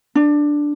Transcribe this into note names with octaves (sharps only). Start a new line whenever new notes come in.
D4